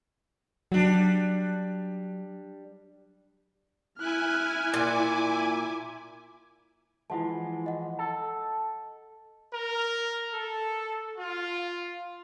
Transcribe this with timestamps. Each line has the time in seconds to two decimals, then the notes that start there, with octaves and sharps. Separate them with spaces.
0.72 F#3 G3 D4
3.98 E4 G#5 F6 F#6
4.74 A#2 D6
7.10 E3 F3 G#3 E4 F#5 A5
7.66 D#5 F#5
7.99 A4
9.54 A#4
10.33 A4
11.18 F4